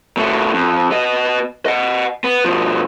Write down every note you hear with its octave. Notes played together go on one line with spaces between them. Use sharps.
B2 A3
F2
B3 D#5
D#5 F#5
B3
B2 F3